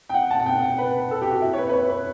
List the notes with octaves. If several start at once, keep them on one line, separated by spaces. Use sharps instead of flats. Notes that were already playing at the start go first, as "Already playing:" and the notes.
G5
F#5
A5
F#5
G5
F#5
B4
A4
G4
F#4
E4
C#5
B4
B4
C#5
B4